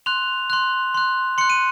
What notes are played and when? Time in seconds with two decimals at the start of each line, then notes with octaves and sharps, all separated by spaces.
0.06 C6 F#6 F7
0.50 C6 F#6
0.94 C6 F#6
1.38 C6 F#6 C#7
1.50 D#7